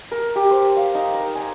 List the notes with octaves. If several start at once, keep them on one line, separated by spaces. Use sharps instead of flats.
A#4
G4
C5
F5
D#4
A#4
G#5